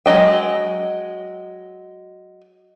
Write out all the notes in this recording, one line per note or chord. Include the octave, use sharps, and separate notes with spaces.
F#3 G#3 A#3 D#5 G5